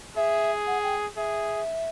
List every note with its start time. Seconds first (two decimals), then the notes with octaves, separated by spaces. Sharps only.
0.16 G#4 E5
0.67 F#5
0.83 G5
1.17 G#4 E5